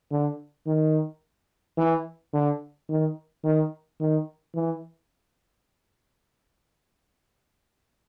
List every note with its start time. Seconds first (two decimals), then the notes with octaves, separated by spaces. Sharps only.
0.11 D3
0.67 D#3
1.78 E3
2.33 D3
2.89 D#3
3.44 D#3
4.00 D#3
4.55 E3